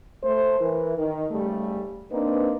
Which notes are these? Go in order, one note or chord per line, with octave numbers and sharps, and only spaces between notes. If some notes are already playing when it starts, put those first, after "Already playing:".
A3 C5
E3 E4 A#4
D#3
G#2 C#3 G3 A3
A#3 C4 D4 D#4 B4